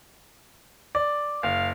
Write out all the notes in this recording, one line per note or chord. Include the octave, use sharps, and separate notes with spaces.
D5
F#1 F5